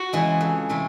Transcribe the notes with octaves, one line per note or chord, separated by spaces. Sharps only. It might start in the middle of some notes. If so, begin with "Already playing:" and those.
Already playing: F#4
C#3 E3 G#3
F2
C3 E3 A3